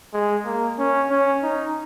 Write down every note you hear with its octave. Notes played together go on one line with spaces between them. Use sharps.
G#3
A#3
C#4
C#4
D#4